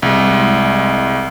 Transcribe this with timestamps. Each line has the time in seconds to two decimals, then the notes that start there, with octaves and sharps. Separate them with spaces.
0.02 C2 G#3